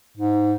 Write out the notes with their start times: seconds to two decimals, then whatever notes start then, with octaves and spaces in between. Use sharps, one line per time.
0.17 G#2